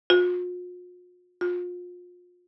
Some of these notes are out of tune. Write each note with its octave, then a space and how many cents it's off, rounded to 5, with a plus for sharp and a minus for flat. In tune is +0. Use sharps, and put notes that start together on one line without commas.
F4 +45
F4 +30